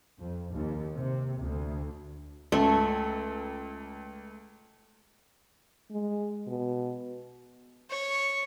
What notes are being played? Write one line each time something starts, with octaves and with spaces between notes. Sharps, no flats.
F2
D#2
C3
D2
C#2 A3
G#3
B2
C#5